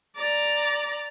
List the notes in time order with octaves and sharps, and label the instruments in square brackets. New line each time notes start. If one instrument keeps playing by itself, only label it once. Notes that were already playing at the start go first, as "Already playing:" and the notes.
[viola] D5 A#5